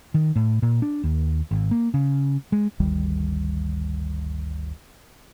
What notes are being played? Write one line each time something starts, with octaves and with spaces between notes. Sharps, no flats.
D#3
A2
A#2
D4
D#2
G#1
A#3
C#3
G#3
G1 D2 D#3 G3